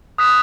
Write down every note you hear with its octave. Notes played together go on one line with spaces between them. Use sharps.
D#6 F#6 B6 E7